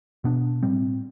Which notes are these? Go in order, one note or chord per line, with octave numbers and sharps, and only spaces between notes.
B2 B3 D4
A2 G3 C4